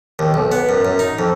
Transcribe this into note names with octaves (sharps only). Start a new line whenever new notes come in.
D#2
B1
B3
F#2
F#2
D#4
F2